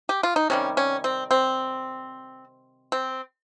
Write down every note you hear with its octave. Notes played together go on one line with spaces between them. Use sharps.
G4
F4
D#4
C3 D#3 G3 C#4
C#4
C4
C4
C4